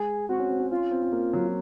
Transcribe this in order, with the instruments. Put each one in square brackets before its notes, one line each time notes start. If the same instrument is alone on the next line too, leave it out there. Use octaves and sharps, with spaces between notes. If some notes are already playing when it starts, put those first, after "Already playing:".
Already playing: [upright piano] G#3 [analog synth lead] G#4
[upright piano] C4 [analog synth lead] F#4
[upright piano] C#4
C4
C#4
[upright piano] C#4 [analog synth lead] F4
[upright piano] C4
C4
A#3
F#3